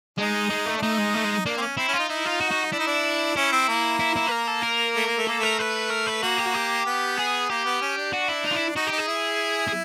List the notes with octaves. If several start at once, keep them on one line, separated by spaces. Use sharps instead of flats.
G#3 D#4
G#3
A3
D4
A3 D#4
G#3
A3
G#3
A#3 D4
C4
C#4
C4 E4
C#4 F4
D#4
D#4 E4
F4
F#4
F#4
D4 E4
D#4
D4
C#4 E4
C4
A#3
E4
E4
B4
A#4
A4
A#4
A3
A#3
A3
A#3 A4
A3 A#4
A3 B4
A#4
B4
A#3 F#4
G4
F#4
G4
B3
G#4
A#3 G4
B3
C#4
D4
F#4
E4
D#4
F4
E4
D#4 F#4
D#4 G4
G#4
E4
G#4